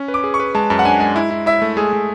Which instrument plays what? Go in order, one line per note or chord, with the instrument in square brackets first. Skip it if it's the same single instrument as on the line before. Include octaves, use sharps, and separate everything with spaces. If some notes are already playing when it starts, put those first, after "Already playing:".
Already playing: [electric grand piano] C#4
B4
[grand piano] D6
[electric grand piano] G#4
[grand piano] C#6
[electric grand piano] B4
[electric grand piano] G#3 [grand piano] A5
[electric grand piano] F#2 [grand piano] A5
[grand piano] F#5
[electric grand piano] D4 [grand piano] G#5
[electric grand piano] G#3 [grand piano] G#5
[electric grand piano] E4
E4
[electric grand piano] E4 [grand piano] E5
[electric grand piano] A3
[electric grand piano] G#3 [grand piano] G#4
[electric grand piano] G#3